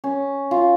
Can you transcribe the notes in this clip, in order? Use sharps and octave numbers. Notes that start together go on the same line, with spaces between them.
C#4
F4